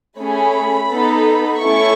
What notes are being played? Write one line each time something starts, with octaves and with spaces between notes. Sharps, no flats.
A3 C#4 G#4 B5
B3 D#4 A4
A3 C#4 E4 A4 C#6